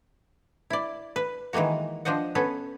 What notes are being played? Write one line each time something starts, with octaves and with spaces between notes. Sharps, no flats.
E4 D5
B4
D#3 E3 G#3 A#3 F#4
F3 D4 C5 D#5 F#5
B3 C#4 A4 B4